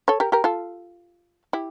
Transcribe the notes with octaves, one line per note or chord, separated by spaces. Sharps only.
A4 C#5
G4 A#4
G4 A#4
F4 A4
E4 G4